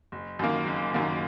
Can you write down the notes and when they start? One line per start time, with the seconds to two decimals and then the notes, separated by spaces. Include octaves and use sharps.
0.12 F#1
0.39 F#2 D#3 A#3
0.67 F#1
0.94 F#2 D#3 A#3